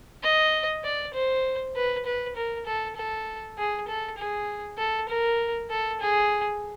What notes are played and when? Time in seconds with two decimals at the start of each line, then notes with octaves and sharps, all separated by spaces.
0.23 D#5
0.84 D5
1.14 C5
1.75 B4
2.05 B4
2.36 A#4
2.66 A4
2.96 A4
3.58 G#4
3.87 A4
4.18 G#4
4.78 A4
5.08 A#4
5.70 A4
6.00 G#4